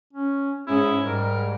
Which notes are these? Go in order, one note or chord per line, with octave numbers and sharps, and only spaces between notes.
C#4
G#2 C#4 E4 G#4
G#2 G3 A#4